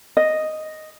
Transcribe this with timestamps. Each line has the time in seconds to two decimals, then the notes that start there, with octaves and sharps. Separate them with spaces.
0.17 D#5